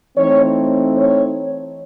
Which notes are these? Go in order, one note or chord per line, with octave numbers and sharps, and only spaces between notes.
E3 A3 C4 D#4 C#5
C#5